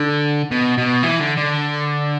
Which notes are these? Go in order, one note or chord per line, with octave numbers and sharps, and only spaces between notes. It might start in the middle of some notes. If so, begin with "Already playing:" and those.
Already playing: D3
B2
B2
E3
D3
D3